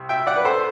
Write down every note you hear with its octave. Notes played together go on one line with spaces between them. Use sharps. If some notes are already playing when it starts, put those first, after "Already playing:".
Already playing: C2 C3
E5 G5
D5 F#5
B4
A4 C5